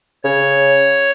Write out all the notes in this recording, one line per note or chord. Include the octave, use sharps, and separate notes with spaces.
C#3 C#5